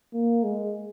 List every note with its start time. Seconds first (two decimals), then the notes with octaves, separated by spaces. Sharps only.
0.14 A#3
0.44 G#3